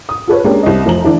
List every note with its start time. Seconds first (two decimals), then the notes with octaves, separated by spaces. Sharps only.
0.09 D#6
0.28 F4 A4 B4 C#5
0.44 G#3 A#3 C#4 D4 G4
0.63 C2 D#5
0.86 F1 F3 A#5 F#7
1.04 D3 E3 D4 E4